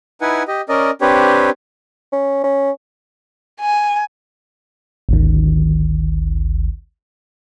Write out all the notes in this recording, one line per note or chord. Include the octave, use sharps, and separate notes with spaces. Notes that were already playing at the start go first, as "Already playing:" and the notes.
D#4 E4 B4 F#5 G#5
G4 D#5
C#4 A#4 D5 D#5
C4 D4 G4 B4 C#5
C#4
C#4
G#5
G#1 D2 D#3